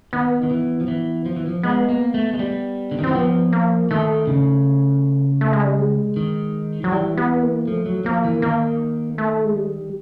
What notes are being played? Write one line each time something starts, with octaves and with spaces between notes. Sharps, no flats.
D#3 B3
D#3
E3
F3
E3
F3
E3
F3
G#3 B3
A#3
A3
G#3
G3
D3
D#3
E3 C4
F3 B3
A#3
D#3 A3
C#3
A3
G#3
G3
G#3
D#3
F3 F#3
E3 G3
B3
A#3
F3 A3
F#3
F3 A#3
E3
D#3 A#3
A3
G#3
G3